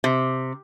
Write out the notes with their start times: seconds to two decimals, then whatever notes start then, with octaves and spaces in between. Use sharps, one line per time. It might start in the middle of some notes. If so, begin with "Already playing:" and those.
0.04 C3